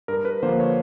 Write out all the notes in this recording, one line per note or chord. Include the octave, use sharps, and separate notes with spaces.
G2 A#4
B4
D3 F3 A#3 C5
C#5